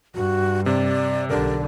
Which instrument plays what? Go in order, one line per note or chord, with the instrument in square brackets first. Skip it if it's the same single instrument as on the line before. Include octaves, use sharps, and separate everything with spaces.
[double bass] G2 [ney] F#4
[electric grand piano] C3 [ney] D5
[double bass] B1 D3 [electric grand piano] G4 A#4 [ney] D5